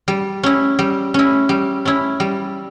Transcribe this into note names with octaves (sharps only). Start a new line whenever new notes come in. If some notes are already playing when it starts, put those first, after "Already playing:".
G3
C#4 E4
G3
C#4 E4
G3
C#4 E4
G3